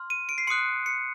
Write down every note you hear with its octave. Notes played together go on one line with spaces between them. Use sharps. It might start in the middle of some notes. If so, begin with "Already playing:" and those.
Already playing: C6 F6
D#7
D7
C7
C6 D#6 F#6 C#7
C#7